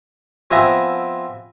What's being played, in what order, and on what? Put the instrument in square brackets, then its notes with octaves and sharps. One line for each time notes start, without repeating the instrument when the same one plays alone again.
[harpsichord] F3 B3 C4 E5 G#5 A#5